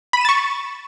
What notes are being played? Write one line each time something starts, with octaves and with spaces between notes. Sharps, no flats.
B5 C#6 A6 D#7 E7